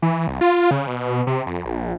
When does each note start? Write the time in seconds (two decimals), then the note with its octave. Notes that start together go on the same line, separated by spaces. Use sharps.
0.02 E3
0.27 C2
0.41 F4
0.71 C#3
0.87 B2
1.27 C3
1.46 F2
1.65 A#1